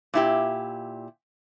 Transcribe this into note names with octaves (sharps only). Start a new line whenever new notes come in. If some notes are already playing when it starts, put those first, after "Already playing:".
A#2 E4 G4